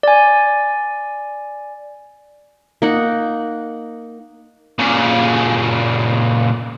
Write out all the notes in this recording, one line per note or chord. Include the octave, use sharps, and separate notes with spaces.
D5 G#5
A#3 D#4 F#5
A#2 C#3